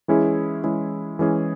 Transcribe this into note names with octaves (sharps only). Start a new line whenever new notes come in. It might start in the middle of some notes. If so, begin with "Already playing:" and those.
E3 G#3 C#4 E4 G#4
E3 G#3 C#4 E4 G#4
E3 G#3 C#4 E4 G#4